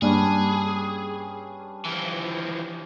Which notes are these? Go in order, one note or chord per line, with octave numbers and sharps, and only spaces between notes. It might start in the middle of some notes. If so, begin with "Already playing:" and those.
G2 G3 A#3 C#4 D4 G#4
E3 F3